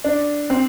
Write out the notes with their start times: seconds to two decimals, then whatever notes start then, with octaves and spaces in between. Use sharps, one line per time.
0.04 D4
0.50 C4